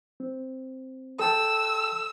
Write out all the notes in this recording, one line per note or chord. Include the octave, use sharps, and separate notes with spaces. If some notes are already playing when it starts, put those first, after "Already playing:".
C4
A4 G5 A5 E6